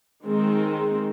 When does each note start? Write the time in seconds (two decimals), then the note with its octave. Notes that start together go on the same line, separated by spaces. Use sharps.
0.25 D#3 G#3 C4